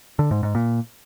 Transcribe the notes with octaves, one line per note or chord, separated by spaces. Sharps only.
D3
G#2
G#2
A#2